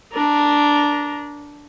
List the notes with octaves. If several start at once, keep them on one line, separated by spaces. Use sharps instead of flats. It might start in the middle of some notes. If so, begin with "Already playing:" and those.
D4 A#4